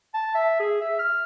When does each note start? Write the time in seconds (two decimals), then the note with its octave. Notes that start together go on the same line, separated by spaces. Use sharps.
0.14 A5
0.35 E5
0.60 G#4
0.81 E5
0.99 F6